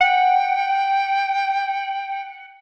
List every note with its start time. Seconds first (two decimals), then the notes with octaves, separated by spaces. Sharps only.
0.01 F#5 G5